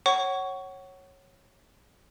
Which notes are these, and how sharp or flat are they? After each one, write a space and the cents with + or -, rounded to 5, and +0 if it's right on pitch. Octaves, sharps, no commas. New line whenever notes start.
C#5 -15 F#5 +25 C#6 +15